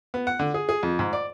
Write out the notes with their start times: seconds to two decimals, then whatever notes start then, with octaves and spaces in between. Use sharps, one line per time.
0.14 B3
0.27 F#5
0.39 D3
0.54 G#4
0.69 G#4
0.83 F2
0.99 G#2
1.13 D5